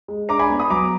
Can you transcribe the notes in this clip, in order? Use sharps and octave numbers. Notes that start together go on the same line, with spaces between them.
G#3
D4 A#5 D6
G#5 B5
B3
B5 D#6
F#3 A#5 D6